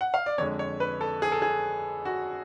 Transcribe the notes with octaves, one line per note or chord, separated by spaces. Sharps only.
F#5
F5
D5
F2 D3 G#3 C#5
C#5
B4
A4
G#4
A4
G#4
F#4